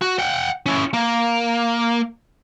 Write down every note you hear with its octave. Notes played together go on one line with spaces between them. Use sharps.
F#4
F#5 G5
C#4 E4
A#3